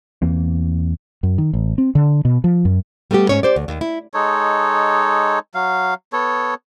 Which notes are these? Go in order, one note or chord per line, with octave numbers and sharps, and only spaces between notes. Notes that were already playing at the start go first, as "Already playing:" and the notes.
E2 E3 A#3 C4
F#2
D#3
A1
C4
D3
B2
F3
F#2
G3 A3 B3 F#4 G4
G#2 C#4 C#5
G4 C5 D5
D2
D#2
E4
G#3 D#4 A4 C#5
F#3 F5
B3 A4 C#5